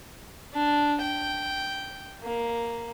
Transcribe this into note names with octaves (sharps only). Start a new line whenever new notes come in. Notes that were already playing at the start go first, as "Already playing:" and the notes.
D4
G5
A#3